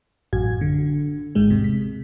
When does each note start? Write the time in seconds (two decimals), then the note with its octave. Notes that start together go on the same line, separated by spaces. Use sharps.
0.33 A1 F#2 F#4 G#6
0.61 D3
1.35 G#1 G#2 G#3
1.50 E2 C3
1.64 B6